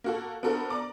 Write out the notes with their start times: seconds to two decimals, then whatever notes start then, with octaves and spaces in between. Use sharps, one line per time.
0.04 A#3 F#4 A4
0.43 B3 D4 F#4 A4 A#4 C5
0.70 D5 A#5 D6